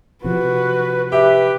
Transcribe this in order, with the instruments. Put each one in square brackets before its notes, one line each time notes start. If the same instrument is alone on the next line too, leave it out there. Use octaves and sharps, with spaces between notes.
[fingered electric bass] C3 F3 [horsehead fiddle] F#4 B4
[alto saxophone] G4 [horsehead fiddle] B4 [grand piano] E5